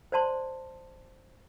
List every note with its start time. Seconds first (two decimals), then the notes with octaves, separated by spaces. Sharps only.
0.12 C5 D5 A5 C6